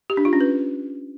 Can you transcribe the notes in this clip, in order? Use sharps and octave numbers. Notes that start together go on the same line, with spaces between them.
G4
D4
F4
C#4
B4